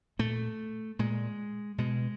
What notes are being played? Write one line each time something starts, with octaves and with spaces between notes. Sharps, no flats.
A#2 A3
A#2 G#3
B2 G#3